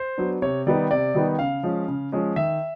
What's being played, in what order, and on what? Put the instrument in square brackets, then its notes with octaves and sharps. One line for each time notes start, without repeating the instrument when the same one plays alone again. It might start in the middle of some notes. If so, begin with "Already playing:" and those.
Already playing: [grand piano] C5
F#3 B3 D4
C3 C#5
D#3 G3 B3 D#4 D5
C3 D5
D#3 G3 B3 D#4
C#3 F5
F3 G#3 C#4
C#3
F3 G#3 C#4
D#3 E5